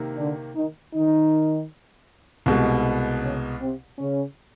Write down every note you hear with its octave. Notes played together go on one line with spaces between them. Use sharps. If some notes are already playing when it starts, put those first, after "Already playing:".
Already playing: C3 D#3 A#3
D3 D4
D#3 D#4
D#3 D#4
C2 B2 G#3
C#3 C#4
C3 C4
C#3 C#4